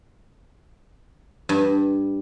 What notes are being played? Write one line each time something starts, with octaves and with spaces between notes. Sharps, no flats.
G2